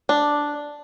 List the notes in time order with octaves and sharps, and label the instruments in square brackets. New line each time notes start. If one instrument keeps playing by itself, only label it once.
[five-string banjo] D4